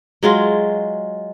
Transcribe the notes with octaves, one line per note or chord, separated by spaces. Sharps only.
F#3 G#3 F4